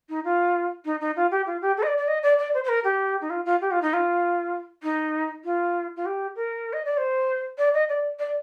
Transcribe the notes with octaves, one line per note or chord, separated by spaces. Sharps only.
D#4
F4
D#4
D#4
F4
G4
F4
G4
A4
D#5
D5
D5
D#5
D5
D5
C5
C5
A#4
G4
D#4
F4
F4
G4
F4
D#4
F4
D#4
F4
F4
G4
A#4
D#5
D5
C5
D5
D#5
D5
D5